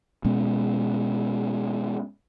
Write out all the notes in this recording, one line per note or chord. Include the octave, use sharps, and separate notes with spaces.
B2 G#3 B3 C#4